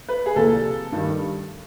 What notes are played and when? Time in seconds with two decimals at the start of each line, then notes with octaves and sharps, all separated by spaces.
0.09 B4
0.26 G#4
0.36 C2 A#2 F3 A4
0.92 G2 D#3 G3